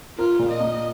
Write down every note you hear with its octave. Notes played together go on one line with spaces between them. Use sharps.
F4 A#4
A#2
D#5
A#3